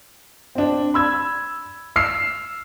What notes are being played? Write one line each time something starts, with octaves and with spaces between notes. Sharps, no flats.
C4 D4
B5 E6 G#6
E6 F6 C7